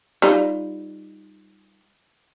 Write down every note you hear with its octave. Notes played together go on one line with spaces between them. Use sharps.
G3 D#4 F4